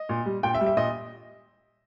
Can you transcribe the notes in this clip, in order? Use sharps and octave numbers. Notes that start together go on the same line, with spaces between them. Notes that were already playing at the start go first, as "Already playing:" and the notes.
Already playing: D#5
A#2
G3
A#2 G5
E5
G3
E5
A#2 D#5